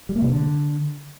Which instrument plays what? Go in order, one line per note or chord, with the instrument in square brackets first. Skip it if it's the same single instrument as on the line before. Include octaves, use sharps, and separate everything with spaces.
[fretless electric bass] G3
A#3
C3
D3